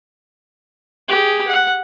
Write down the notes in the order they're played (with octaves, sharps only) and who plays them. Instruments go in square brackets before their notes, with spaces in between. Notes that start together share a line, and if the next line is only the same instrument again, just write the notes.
[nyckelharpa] G4 G#4
F#5